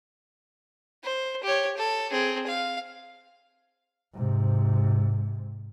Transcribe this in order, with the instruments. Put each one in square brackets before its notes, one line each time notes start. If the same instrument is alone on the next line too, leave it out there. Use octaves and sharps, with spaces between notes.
[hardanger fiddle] C5
G4 C#5
A4
C4 G#4
F5
[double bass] G#2 C3